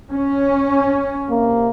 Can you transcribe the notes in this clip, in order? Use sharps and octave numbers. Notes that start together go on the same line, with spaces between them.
C#4
C3 A#3